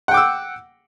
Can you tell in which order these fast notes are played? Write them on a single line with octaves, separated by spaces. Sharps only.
F#5 G5 D6 E6